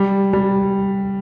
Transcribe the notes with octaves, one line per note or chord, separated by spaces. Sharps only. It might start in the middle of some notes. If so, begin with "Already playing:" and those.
Already playing: G3
G3